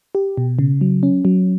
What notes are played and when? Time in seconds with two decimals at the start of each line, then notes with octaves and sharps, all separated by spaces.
0.15 G4
0.37 B2
0.59 C#3
0.81 F#3
1.03 C#4
1.25 F#3